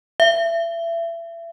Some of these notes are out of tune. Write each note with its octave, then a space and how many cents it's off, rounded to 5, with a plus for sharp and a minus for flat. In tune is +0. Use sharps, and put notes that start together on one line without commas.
E5 +30